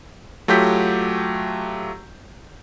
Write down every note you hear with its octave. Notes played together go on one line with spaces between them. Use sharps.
F#3 A3 F4 G4 G6 B6